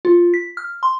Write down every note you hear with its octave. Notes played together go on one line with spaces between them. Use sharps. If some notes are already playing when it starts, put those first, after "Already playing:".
F4
B6
F6
C6